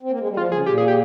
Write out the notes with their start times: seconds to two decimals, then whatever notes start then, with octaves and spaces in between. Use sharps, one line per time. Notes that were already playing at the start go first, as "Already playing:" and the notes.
0.03 C4
0.10 A#3
0.20 G#3
0.29 G3
0.37 F3 F4
0.52 C#3 G#4
0.66 A#2 G4
0.78 G#4
0.88 G4